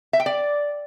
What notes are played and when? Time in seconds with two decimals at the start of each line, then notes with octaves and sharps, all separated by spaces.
0.13 E5
0.20 G5
0.26 D5